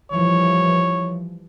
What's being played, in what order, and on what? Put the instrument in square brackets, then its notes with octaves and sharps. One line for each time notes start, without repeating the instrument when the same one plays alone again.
[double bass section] E3 F3 G3 [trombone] C#5